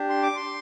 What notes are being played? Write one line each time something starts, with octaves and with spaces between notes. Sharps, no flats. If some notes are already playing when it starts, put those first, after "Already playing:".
Already playing: D4 G4
C6
D6
C6